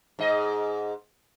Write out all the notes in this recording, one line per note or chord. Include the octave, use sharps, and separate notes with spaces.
G#2 D#5